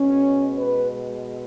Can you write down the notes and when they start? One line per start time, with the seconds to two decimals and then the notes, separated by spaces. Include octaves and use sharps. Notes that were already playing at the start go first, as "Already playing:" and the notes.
Already playing: B2 G#3 C#4
0.56 B4